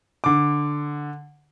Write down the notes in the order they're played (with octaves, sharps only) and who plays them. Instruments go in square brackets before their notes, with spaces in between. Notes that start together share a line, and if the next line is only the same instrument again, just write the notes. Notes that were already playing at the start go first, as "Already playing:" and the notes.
[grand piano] D3 D6